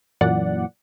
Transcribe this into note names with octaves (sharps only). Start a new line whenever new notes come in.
F#2 A#2 E3 D5 F#5